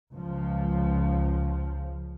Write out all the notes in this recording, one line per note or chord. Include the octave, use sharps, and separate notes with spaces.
C#2 F3